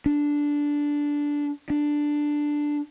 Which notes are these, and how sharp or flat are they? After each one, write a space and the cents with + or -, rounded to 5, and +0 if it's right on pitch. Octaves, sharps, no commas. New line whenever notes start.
D4 -10
D4 +5